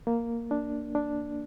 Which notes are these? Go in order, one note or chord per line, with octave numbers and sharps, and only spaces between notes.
A#3
D4
D4